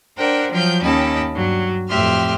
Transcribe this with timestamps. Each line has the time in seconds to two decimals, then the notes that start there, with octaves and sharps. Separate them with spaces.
0.17 D4 A#4 C5 F#5 G5
0.50 F3 F#3 G5 F6 G6
0.81 D#2 C#4 D#5 G5 A5 B5
1.32 G2 F#3
1.88 F2 A2 G4 E5 C6 F6